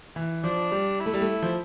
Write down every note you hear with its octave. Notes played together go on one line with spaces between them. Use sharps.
E3
F3 D4
G3
E4
A3
G3
A3
F3